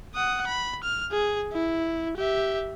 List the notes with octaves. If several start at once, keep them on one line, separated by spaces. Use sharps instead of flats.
F#5 D#6
B5
F6
G#4
E4
G4 E5